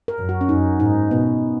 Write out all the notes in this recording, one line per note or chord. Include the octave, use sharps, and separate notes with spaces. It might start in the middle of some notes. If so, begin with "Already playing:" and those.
A#4
F#2
F#4
C#4
F#2 D#4
G#2 D#4
B2 B3